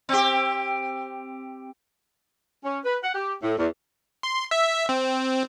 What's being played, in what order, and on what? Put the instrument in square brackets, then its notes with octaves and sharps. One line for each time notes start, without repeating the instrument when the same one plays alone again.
[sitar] C4 G4
[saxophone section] C#4
B4
F#5
G4
A2
E2
[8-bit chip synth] C6
E5
C4